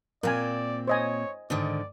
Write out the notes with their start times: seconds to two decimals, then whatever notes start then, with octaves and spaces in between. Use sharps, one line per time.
0.23 A#2 C4 A#4 D5 G#5
0.87 C5 C#5 D#5 G#5
1.50 G#2 D3 D#3 D5